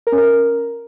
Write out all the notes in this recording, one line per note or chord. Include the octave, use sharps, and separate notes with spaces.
A#4
C#4
A#4